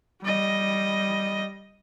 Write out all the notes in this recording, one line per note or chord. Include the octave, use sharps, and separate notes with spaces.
G3 D#5